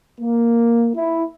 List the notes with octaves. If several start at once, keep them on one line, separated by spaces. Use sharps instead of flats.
A#3
E4